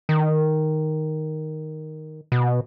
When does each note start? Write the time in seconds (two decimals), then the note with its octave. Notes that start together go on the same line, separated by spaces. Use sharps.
0.09 D#3
2.32 B2